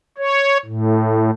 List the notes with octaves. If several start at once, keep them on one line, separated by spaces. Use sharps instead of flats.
C#5
A2